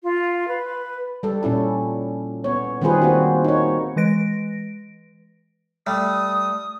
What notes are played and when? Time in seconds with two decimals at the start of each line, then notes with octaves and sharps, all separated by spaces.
0.03 F4
0.47 B4
1.23 G3 A4
1.43 A#2 C#4 E4 A4
2.44 B3 C#5
2.81 D#3 G3 C4 F4 G#4 B4
3.02 A#3 C4 F#4
3.44 D#4 C#5
3.96 E3 G#3 B4 A#6 D7
5.87 G3 A3 D#6